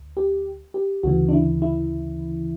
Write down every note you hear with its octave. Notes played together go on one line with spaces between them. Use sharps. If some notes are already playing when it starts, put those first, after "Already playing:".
Already playing: D2
G4
G4
D2 C#3 E3 F#4
D4
E4
E4